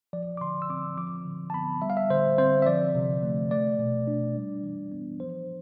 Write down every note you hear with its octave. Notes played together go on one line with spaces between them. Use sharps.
F3 D5
D6
D3 C6
E6
C4 D6
F3 D6
D3
A5
B3 B5
G3 E5
F5
E5
D3 C5
C4 C5
E5
F3 D5
C3
A3
A3 D5
B2
D4
G3
E3
B3
F3 C5